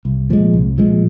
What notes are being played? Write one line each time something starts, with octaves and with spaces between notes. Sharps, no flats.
C2
A#2 F3 G#3
C2
A#2 F3 G#3